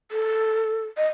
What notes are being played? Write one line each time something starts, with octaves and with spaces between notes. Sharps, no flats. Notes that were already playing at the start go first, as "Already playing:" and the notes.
A4
D#5